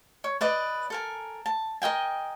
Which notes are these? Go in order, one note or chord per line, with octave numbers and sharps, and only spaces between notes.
C#5
B4 D5 D#5 D6
A4 A#4 G#5
A5
A#4 D#5 G5 G#5